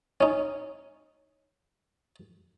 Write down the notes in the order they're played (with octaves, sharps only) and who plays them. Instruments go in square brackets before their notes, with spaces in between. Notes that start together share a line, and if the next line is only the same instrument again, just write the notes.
[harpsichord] C#4 D#4